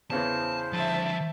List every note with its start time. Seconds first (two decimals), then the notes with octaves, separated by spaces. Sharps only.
0.10 E2 C#3 E3 C5 A5
0.73 D3 F3 E5 A5